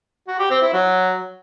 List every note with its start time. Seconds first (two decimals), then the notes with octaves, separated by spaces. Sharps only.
0.28 F#4
0.39 G4
0.51 C4
0.62 E4
0.73 F#3